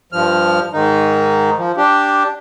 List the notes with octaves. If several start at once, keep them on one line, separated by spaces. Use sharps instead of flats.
G2 F3 F6
G#2 D#3 D#4
F3
D4 G4